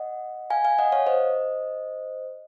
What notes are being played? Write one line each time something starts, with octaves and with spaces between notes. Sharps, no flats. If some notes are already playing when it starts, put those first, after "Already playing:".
Already playing: D#5 F#5
F5 G#5
F5 G#5
D#5 F#5
C#5 F5
C5 D#5